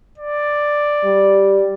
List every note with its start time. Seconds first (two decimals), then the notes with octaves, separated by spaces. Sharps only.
0.18 D5
1.04 G3